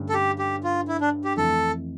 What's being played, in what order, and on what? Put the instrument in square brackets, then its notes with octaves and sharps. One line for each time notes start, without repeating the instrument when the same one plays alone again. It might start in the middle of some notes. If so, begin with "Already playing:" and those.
Already playing: [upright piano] G2 D3 A3 C#4
[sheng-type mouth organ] A4
G4
G4
F4
E4
D4
G4
[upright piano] F2 E3 A3 [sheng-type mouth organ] A4